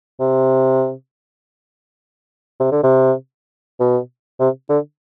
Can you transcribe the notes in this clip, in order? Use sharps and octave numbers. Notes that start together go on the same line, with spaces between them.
C3
C3
D3
C3
B2
C3
D3